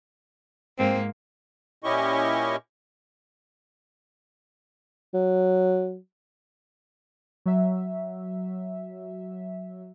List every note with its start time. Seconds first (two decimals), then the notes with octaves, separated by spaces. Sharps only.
0.78 G#2 A#3 C4
1.84 A#2 C#4 E4 G4 D#5 C#6
5.14 F#3
7.46 F#3 E5